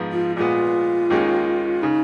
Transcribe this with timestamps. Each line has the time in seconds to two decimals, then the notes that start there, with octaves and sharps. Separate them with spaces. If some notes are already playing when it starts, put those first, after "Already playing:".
Already playing: G#2 F3 B3
0.12 F4
0.36 A#2 G#3 B3 F4
1.10 D#2 D#3 G#3 C#4
1.82 C#3 D#4